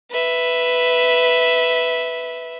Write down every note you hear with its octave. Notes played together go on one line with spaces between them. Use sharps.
B4 E5